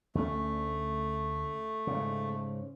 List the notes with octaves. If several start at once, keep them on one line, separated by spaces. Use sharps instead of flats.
D2 A3 C#4
G#2 C#3